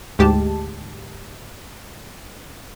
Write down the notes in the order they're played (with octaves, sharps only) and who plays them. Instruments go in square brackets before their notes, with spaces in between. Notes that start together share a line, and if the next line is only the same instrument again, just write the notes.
[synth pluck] D2 G#2 G#3 G4 A5